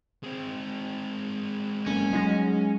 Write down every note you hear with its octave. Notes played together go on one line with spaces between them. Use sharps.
G#3 C4
F#1 C#4
F#3 G#3 D#4 A#6